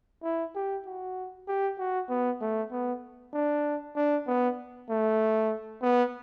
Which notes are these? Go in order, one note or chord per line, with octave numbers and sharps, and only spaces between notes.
E4
G4
F#4
G4
F#4
B3
A3
B3
D4
D4
B3
A3
B3